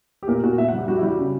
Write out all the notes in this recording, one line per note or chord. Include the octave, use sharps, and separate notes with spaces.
G4
A#2 A#4
A#2 F#4
A#2 E5
F#5
G3
G4
G3 F#4
E4
G3
F#4
C#3